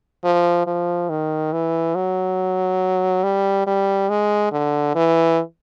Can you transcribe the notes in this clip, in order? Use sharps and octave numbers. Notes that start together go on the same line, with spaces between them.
F3
F3
D#3
E3
F#3
G3
G3
G#3
D3
E3